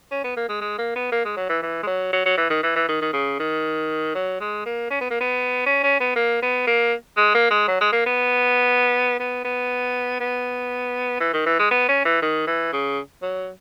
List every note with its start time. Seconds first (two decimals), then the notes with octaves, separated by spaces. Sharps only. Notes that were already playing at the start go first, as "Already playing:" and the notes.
0.11 C#4
0.24 B3
0.36 A#3
0.49 G#3
0.61 G#3
0.78 A#3
0.95 B3
1.12 A#3
1.25 G#3
1.37 F#3
1.49 E3
1.62 E3
1.83 G#3
1.87 F#3
2.13 F#3
2.25 F#3
2.37 E3
2.50 D#3
2.63 E3
2.76 E3
2.88 D#3
3.02 D#3
3.13 C#3
3.39 D#3
4.15 F#3
4.40 G#3
4.65 A#3
4.90 C#4
5.00 B3
5.10 A#3
5.20 B3
5.66 C#4
5.83 C#4
6.00 B3
6.16 A#3
6.42 B3
6.67 A#3
7.17 G#3
7.35 A#3
7.50 G#3
7.68 F#3
7.81 G#3
7.92 A#3
8.06 B3
9.19 B3
9.44 B3
10.20 B3
11.20 E3
11.33 D#3
11.46 E3
11.59 G#3
11.71 B3
11.88 C#4
12.05 E3
12.22 D#3
12.47 E3
12.73 C#3
13.22 F#3